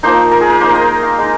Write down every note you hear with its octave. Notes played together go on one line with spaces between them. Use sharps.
F3 A#3 D#4 C5
A#4
G#4
A#4
A#3 D#4 C5
D#5
F5
G#3 D#4